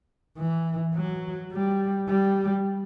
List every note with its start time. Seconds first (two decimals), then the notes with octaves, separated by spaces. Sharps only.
0.38 E3
0.95 F#3
1.52 G3
2.09 G3